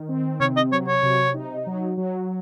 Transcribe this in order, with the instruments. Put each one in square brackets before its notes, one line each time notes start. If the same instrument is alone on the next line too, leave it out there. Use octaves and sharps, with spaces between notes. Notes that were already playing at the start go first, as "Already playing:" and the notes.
Already playing: [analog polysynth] D#3
C4
[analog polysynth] C3 [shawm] C#5
[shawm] D#5
[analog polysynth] F#3 [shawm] C#5
[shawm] C#5
[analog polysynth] C3
D#4
F#3
F#3